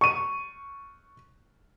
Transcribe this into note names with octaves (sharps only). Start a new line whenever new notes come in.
C#6 D#7